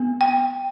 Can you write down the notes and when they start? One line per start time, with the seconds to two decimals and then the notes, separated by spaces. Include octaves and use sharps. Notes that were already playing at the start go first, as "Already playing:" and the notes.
Already playing: B3
0.21 G5